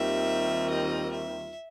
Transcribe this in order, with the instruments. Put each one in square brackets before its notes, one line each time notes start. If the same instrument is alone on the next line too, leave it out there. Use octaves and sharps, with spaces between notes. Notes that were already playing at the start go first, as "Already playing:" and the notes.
Already playing: [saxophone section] D#2 D#3 G3 C4 F4 [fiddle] E5
[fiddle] D#5
E5